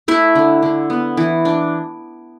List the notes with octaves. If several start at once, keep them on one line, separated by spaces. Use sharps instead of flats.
A3 E4 E5
D3
D3
B3
E3
D4